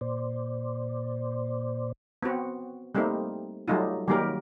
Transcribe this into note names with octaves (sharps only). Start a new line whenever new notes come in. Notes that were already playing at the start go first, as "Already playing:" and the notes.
A#2 C5 D5
B3 C4 F#4
G3 A3 A#3 C4 D#4
F#3 G3 A3 D#4 F4
D#3 F#3 G3 A#3 G4 A#4